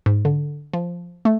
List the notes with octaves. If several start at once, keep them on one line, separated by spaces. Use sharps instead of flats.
G#2
D3
F3
A3